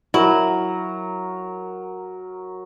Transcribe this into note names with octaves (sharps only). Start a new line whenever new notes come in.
F#3 E4 A#4 A#5